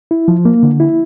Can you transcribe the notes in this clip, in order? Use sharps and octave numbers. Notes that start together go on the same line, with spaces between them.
E4
F3
A#3
D3
E4